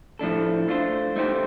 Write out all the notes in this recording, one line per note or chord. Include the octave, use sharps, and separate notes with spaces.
A2 F3 A3 D4 A4
A3 D4 F4 C5
A3 D#4 G4 C5